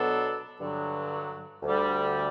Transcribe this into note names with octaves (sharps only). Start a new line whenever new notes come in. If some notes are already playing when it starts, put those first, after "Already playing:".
Already playing: B2 F#3 B3 D4 A4
G2 D3 F#3
D2 D3 G3